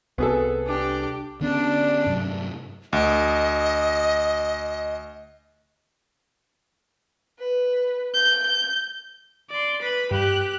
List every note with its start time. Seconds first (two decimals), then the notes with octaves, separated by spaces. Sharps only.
0.18 C2 B3 G#4 A4
0.67 D4 G4
1.41 D3 B3 C#4 D4
2.06 G2 C3 F#3
2.93 D2 D#5
7.39 B4
8.14 G6
9.50 D5 C6
9.82 B4 B5
10.11 G2 G4 F#6